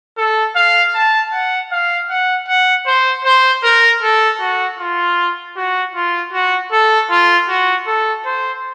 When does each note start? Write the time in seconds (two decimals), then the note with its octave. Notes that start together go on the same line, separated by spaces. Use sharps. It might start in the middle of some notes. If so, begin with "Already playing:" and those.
0.18 A4
0.56 F5
0.94 A5
1.33 F#5
1.72 F5
2.09 F#5
2.48 F#5
2.86 C5
3.25 C5
3.63 A#4
4.03 A4
4.41 F#4
4.79 F4
5.57 F#4
5.95 F4
6.33 F#4
6.72 A4
7.11 F4
7.49 F#4
7.87 A4
8.26 C5